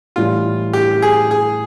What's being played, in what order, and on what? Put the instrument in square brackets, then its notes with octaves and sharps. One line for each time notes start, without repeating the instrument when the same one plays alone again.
[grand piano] A2 E3 G3 [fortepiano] F4
[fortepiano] G4
G#4
G#4